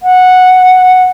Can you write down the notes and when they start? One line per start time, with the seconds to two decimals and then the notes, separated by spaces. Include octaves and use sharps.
0.03 F#5